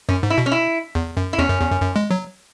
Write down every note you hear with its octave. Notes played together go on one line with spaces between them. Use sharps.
F#2 C#4
G#2
E4
B2
C#4
E4
E2
F#2
E4
E2 C#4
F#2
E2
F#2
F#2
G#3
F#3